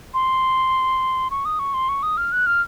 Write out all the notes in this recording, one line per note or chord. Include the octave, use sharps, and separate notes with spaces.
C6
C#6
D#6
C#6
C6
C#6
D#6
F6
F#6
F6